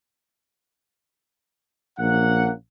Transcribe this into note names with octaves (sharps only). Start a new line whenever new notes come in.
A#1 A#3 C#4 F#5